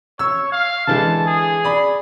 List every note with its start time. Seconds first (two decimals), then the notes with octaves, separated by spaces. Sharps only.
0.19 C#5 E6
0.52 F5
0.87 D3 E3 G#3 A5
1.26 G#4
1.65 D5 B5